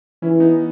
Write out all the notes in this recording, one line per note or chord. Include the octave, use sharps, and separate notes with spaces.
E3 C#4 E4
B3 D#4